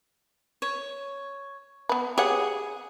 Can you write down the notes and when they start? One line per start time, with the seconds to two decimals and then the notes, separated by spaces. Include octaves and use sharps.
0.62 C#5
1.89 B3 B4
2.18 G4 G#4 C#5 F#5